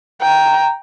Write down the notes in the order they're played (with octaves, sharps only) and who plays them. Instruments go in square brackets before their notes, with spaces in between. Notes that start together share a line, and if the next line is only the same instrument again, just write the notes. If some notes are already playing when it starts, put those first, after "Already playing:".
[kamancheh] G5 A#5